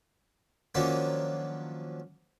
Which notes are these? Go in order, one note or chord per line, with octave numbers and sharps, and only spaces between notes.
D#3 F3 F#3 A#3 C#4 D4